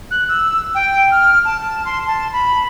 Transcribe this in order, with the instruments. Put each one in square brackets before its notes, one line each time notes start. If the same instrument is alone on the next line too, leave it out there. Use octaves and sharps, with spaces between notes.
[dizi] F#6
E6
G5
F6
A5
C6
A5
B5